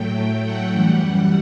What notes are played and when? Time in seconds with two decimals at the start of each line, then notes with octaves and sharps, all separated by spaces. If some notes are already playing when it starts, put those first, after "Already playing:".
Already playing: A2 F#3 A3 G5
0.42 F#5
0.71 F#2 E3 G3 F#5